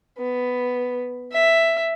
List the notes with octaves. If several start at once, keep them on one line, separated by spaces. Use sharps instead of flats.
B3
E5